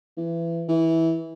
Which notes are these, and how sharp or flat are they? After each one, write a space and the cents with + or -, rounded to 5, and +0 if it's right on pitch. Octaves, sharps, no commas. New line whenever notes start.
E3 +25
E3 -15